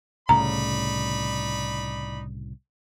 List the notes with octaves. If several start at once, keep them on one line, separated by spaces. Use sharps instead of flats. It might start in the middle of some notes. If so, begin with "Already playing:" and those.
C2 A2 C#3 D#4 D5 A#5 B5